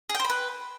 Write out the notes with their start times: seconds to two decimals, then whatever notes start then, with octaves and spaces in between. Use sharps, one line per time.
0.09 G#4
0.15 G5
0.20 C5
0.25 B5
0.30 B4